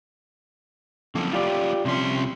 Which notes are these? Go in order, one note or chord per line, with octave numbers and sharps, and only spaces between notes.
F2 A#3 C#4
F4 G4 D5
C2 C3 F3 C#4 C6